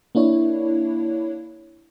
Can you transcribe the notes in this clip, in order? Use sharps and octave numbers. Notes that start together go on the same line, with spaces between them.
A#3 D4 E4 C#5